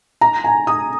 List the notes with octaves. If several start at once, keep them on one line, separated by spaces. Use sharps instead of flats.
A#5
G#5
D#6